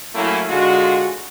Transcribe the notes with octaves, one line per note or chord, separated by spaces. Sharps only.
F#3 A3 A#3 C#4 E4
D3 G#3 F4 F#4